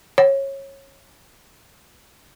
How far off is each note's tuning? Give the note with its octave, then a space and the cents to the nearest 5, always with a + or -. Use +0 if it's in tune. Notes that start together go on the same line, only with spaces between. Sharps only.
C#5 -20